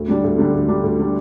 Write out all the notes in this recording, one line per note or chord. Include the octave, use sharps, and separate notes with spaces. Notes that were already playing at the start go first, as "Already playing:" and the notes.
Already playing: D2
D3 G3 D4
D2
D3 G3 D4
D2
D3 G3 D4
D2
D3 G3 D4